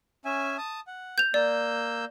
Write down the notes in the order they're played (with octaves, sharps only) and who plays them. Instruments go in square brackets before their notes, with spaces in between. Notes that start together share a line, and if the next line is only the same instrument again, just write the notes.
[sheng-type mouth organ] C#4 E5 G#5
A5 D#6
F#5
[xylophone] G6 F7
[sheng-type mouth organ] A#3 E6 G6 [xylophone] D5